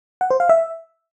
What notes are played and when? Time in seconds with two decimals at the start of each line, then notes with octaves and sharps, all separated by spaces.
0.21 F#5
0.30 C5
0.40 F5
0.49 E5